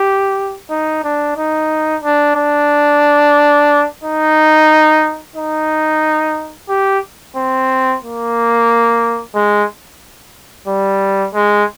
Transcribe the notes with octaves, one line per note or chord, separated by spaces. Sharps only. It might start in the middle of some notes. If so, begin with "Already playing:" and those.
Already playing: G4
D#4
D4
D#4
D4
D4
D#4
D#4
G4
C4
A#3
G#3
G3
G#3